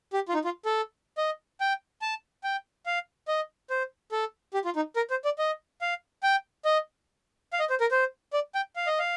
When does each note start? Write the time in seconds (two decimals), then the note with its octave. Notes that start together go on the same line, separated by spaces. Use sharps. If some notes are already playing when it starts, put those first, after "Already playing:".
0.13 G4
0.29 F4
0.34 D#4
0.45 F4
0.65 A4
1.18 D#5
1.61 G5
2.02 A5
2.44 G5
2.86 F5
3.28 D#5
3.70 C5
4.12 A4
4.54 G4
4.65 F4
4.76 D#4
4.96 A#4
5.10 C5
5.25 D5
5.39 D#5
5.81 F5
6.23 G5
6.65 D#5
7.53 F5
7.60 D#5
7.70 C5
7.81 A#4
7.91 C5
8.33 D5
8.55 G5
8.76 F5
8.87 D#5
8.99 F5